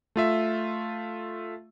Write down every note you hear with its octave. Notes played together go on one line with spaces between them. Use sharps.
A3 F4 E5